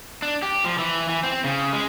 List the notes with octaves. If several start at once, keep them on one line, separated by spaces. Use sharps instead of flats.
D4
G4
F3
E3
E3
C4
C#3
G#3